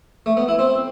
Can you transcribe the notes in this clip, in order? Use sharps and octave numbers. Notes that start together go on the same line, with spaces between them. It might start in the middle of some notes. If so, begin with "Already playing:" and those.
A3
B3
E4
C4